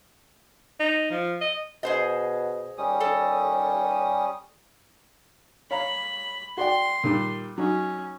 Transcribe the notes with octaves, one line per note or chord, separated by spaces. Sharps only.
D#4
F3
D#5
B2 G#4 C5 D#5
D#2 G3 C#4 D#6
A4
C#5 F5 A#5 B5
F#4 D5 G5 C6
A#2 D#3 G3
F#3 C#4 D#4